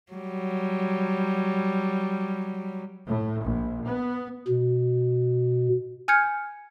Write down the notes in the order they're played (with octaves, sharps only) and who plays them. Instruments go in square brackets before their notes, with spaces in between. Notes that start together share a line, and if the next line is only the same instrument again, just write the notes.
[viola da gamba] F#3 G3
[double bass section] A2
A#1
B3
[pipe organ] B2
[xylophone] G#5 F6 G6 G#6 C#7